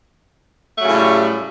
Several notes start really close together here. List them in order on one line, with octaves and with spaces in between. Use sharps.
A3 F#3 C#3 A2 G3